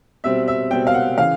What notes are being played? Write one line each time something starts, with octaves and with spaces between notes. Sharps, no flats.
B2 G3 C4 E5
E5
B2 G3 C4 G5
F5
F#5
C#3 E3 F5